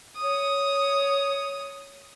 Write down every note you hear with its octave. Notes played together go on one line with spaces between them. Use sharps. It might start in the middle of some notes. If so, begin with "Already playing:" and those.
C#5 D#6